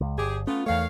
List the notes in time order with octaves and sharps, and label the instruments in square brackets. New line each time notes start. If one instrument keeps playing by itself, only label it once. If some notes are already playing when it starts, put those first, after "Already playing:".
[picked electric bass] C#2
[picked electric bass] G1 [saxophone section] G4 G#4
[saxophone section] A3 B3 F4 [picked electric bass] C#4
[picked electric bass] E2 A3 [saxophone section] D#3 C#5 F5